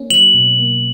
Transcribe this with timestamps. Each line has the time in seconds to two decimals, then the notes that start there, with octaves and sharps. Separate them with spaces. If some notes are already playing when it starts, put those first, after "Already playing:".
Already playing: A#3 C#4
0.10 F#3 F#7
0.34 B2
0.59 A#3